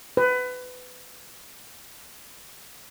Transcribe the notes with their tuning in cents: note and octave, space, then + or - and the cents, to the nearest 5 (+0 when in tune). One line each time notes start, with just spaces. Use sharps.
B4 +20